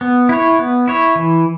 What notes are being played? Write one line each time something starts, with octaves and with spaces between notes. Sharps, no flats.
B3
E4 C#5
B3
E4 C#5
E3